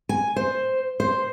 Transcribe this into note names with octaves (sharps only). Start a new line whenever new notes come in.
G#5
C5
C5